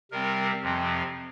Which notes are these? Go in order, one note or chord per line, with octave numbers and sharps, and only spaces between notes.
C3 G3 C4 A#4
F2 C3 F3 C4